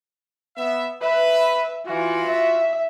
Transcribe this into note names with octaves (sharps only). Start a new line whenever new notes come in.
B3 E5
B4 E5
E3 F4 F#4
E5